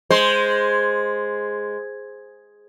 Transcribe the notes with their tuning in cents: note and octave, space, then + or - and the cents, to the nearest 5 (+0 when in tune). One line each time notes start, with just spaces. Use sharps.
G#3 +0 C5 +0